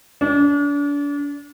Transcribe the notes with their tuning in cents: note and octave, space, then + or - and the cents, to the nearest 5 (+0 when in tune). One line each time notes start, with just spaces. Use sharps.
D4 -35